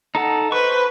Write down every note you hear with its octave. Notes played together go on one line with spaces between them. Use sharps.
D#4 A4 F#5
B4 C5 C#6